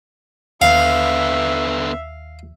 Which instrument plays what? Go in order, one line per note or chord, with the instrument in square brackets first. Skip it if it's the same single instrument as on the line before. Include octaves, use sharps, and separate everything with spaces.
[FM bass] D#2 [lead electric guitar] D3 B3 [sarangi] E5 [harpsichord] F5